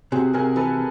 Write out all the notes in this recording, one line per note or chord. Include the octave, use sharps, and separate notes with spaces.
C3 F#4 G#4
C3 G#4 A#4
E3 A4 B4